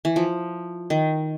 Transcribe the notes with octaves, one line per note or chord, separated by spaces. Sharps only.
E3
F3
D#3